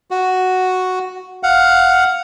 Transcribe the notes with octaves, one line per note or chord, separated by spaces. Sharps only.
F#4
F5 F#5